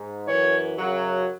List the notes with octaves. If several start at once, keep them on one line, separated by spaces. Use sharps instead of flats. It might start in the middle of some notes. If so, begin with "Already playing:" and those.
Already playing: G#2
F#2 E3 C#5
F#2 C#3 F#3